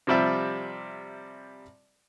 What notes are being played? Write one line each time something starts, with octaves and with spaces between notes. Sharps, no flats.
C3 F3 G3 D5 E5